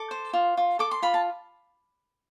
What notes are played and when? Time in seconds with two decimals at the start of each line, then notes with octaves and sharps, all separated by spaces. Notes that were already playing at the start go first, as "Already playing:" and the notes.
Already playing: A4 D6
0.11 C5
0.33 F4
0.57 F4
0.79 A4 D6
0.91 C6
1.02 F4 B5
1.14 A5